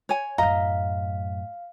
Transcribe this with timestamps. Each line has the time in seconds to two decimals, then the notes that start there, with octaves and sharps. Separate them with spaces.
0.09 C#5 G#5
0.38 F#2 A2 D#5 F5 A#5